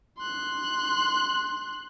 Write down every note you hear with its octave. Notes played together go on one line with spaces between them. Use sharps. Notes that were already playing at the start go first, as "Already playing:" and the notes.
C6 F#6